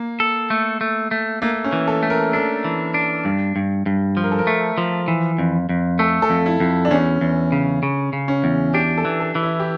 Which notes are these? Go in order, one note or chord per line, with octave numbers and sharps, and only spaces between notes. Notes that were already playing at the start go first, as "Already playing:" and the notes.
Already playing: A#3
A4
A3
A3
A3
A3 A#3
C#4
E3
A4
A3
A#4
D4 A4
E3
D4
G2
G2
G2
F3
A#4
A4
A#4
A3
F3
E3
F2
F2
A3 A4
A4
F2
E4
F2
D4
E2 C#4
E2
C#3
C#3
C#3
C#4
E2
D4 G4
A4
E3
A4
E3
E4
G4